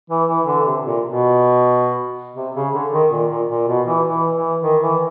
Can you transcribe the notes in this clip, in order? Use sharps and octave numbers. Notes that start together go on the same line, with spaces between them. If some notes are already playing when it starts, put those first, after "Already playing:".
E3
E3
D3
C3
A#2
B2
C3
C#3
D3
D#3
A#2
A#2
A#2
B2
E3
E3
E3
D#3
E3